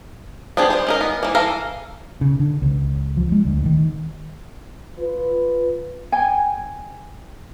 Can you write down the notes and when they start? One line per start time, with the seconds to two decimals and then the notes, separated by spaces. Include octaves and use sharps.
0.57 B3 C4 D4 G4 G#4
0.70 G3 C5
0.87 C#4 D#4 A#4
1.01 B3
1.23 E3 A#3
1.35 E3 A4 E5 F5 A#5
2.21 C#3
2.40 D3
2.62 C#2
3.17 F3
3.32 G#3
3.45 D2
3.65 D#3
4.98 F4 B4
6.12 G5 G#5